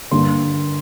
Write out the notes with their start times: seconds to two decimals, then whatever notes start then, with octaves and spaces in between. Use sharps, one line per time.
0.11 G2 D3 G3 A#3 C6